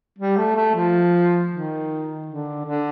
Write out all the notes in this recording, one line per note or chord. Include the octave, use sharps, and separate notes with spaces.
G3
A3
A3
F3
D#3
D3
D3